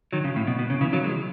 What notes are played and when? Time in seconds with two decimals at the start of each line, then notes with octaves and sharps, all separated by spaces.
0.13 D#3 F#3
0.24 C#3
0.36 A2
0.47 B2
0.59 B2
0.70 C#3
0.81 C#3 E3
0.92 D#3 F#3
1.04 E3 G#3